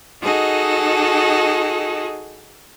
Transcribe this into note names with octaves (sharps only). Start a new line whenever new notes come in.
D#4 F#4 G#4 A4 D#5